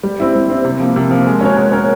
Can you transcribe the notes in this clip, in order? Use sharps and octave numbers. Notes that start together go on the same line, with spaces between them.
G3
C4 E4
G3
C4 E4
C3
F3 A#3
C3
F3 A#3
G#3
C#4 F#4 A#4 C#5
G#3
C#4 F#4 A#4 C#5